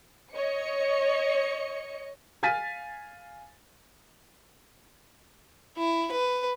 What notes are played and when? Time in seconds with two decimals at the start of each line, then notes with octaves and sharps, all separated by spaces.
0.34 C#5 D#5 C#7
2.43 F5 G#5 F6 A6 B6 D#7
5.77 E4
6.11 B4